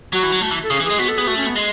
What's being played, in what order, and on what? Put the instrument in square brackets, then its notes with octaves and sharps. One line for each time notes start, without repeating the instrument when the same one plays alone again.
[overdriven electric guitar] F#3 [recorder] F#4
[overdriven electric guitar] E3
F#3
A3
E3
[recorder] A4
[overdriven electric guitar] C#3 [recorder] G#4
[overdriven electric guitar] E3
[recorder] G#4
[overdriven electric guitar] G#3
[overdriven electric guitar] B3 [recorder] F#4
[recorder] A4
[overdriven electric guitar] B3 [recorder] G#4
[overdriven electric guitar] A3 [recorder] F#4
[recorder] C#4
B3
[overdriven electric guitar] G#3